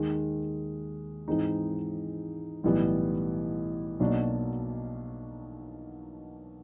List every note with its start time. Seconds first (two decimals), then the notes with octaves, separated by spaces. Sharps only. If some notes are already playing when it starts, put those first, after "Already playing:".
Already playing: D#2 D#3 G#3
1.28 G#2 E3 G#3 C4 D#4
2.64 B1 A2 E3 G3 B3
3.99 B1 B2 F#3 A#3 D4